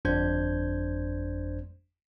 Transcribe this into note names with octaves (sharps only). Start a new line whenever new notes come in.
G1 F2 D4 C5 G6 G#6